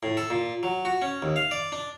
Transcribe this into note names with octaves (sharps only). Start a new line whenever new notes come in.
A2
A4
A#2
F#3
F#4
C#4
D#2
F5
D5
D4